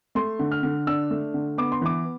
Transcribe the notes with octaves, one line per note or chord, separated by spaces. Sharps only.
A3 C6
D3
F6
D3
D4 E6
A3
D3
B3 D6
C6
E3 D6